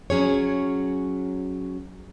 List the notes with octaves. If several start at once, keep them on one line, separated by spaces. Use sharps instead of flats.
F#3 C#4 G#4 C#5